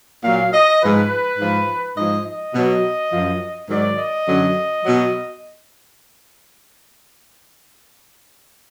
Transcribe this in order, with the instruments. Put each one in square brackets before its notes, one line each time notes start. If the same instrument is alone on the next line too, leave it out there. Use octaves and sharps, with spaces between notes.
[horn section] A#2 F#3 F5
D#5
G#2 F3 B4
G#2 F3
G#2 F3 D#5
D#5
B2 F#3
F#2 F3
G#2 D#3 F#3 D5
D#5
F#2 D3 F#3
B2 F#3